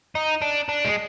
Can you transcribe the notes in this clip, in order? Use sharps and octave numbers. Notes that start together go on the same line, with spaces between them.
D#4
D4
D4
G#3